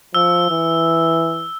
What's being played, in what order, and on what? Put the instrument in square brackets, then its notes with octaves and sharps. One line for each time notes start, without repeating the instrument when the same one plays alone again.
[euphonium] F3 [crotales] E6
[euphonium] E3